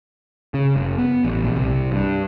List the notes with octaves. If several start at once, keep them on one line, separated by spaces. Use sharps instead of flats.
C#3
F#1
B3
A1
A#1
C2
G2